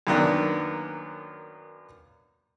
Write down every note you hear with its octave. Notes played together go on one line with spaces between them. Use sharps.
F#2 D#3 A#3 B3 D4